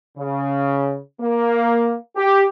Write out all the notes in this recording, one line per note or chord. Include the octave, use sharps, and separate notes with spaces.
C#3
A#3
G4